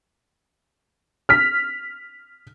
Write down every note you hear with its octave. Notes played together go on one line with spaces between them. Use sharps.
F6 B6